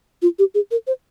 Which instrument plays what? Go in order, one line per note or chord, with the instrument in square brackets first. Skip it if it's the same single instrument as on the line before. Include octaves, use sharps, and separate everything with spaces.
[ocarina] F4
G4
G#4
A#4
C5